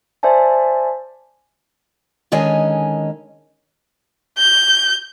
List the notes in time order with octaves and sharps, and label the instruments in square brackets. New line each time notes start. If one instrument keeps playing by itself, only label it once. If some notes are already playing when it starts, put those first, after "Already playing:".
[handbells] C5 D5 E5 G#5 A5
[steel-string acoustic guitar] D3 D#3 G#3 C#4 D#5 G#5
[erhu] G6